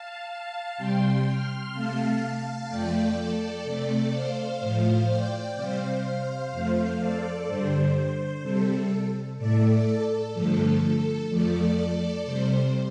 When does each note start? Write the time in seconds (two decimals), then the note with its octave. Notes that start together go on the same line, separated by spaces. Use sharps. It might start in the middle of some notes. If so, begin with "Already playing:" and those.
Already playing: F5 A5
0.30 F5 A5
0.77 C3 G3 G5 C6
1.25 C6 F6
1.73 C3 A3 F5 A5
2.68 F2 F3 A3 D5 G5
3.17 A4 D5
3.64 C3 A3 A4 D5
4.12 C5 F5
4.60 A2 F3 A3
5.08 D5 G5
5.56 C3 G3 C5 F5
6.03 C5 F5
6.51 F2 F3 A3
6.99 A4 D5
7.47 G2 D3 G3 C5
8.43 C3 G3 A4
9.38 A2 A3 A4 D5
9.86 A4
10.34 G2 D3 F3 A3 A4
11.29 F2 F3 A3 A4 D5
12.25 C3 G3 C5